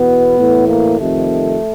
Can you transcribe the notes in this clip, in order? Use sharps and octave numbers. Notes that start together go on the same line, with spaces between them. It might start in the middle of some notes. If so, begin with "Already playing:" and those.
Already playing: E2 B2 B3
A2 E3
A#3
F2 C3 D#3 A3